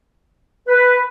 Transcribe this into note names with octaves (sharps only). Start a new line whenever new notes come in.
B4